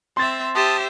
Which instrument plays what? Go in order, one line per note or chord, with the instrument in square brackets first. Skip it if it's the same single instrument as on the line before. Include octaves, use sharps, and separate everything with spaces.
[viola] C4 E5 [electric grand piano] C6 A6
[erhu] G4 [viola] C5 E5 [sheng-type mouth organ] A5 D#6